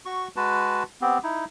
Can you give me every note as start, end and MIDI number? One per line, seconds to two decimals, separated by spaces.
0.06 0.28 66
0.06 0.28 85
0.36 0.83 56
0.36 0.83 66
0.36 0.83 71
0.36 0.83 81
1.01 1.18 59
1.01 1.18 60
1.01 1.18 67
1.23 1.45 63
1.23 1.45 64